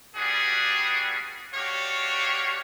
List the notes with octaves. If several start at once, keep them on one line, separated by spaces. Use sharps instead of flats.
G3 B3 D4 F#4 G#4
D4 F#4 G4 C#5 F5